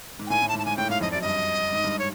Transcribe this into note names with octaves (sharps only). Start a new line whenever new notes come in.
G#2
G5
A2 G#5
A2
A5
G#2
A5
G#2 G#5
A2 G5
G#2 F5
F2 D#5
F#2 D5
G2 D#5
G#2
G2
C#5